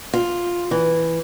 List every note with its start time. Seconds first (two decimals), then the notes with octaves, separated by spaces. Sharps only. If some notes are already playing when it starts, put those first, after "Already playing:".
0.13 F4
0.71 E3